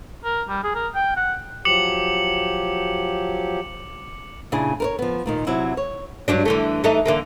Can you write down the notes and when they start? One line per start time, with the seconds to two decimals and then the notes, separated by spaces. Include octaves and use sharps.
0.25 A#4
0.48 G3
0.64 G#4
0.75 A#4
0.95 G5
1.16 F#5
1.65 F3 F#3 G4 D6 C#7 F#7
4.52 A#2 C#3 D4 E4 G#4
4.80 A#4 B4 C#5
4.99 F3 B3
5.26 D#2 A#2 D#3
5.47 C3 F#3 E4
5.77 C#5
6.28 G2 F#3 D4
6.45 D3 E3 A3
6.84 E3 A3 D#4
7.06 D3 E3 A#3